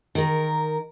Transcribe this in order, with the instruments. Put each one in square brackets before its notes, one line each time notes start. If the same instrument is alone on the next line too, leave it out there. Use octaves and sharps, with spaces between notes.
[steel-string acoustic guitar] D#3 A#4